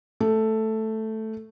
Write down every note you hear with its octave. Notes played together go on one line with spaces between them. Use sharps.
A3